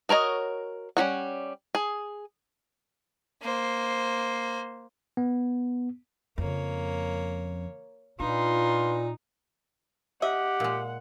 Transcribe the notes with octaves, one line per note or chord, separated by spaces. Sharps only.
F#4 A#4 C#5 D#5
G3 C#4 F#4 F#5
G#4
A#3 C5
B3
F2 C#3 A#3 C#5
A#2 D4 D#4 F4 B4 C6
G4 D#5 E5 F#5
A#2 G#3